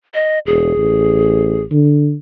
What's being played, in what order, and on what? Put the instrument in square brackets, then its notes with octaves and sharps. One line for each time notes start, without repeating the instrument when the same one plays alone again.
[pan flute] D#5
[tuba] E1 [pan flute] G#4
[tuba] A1
D3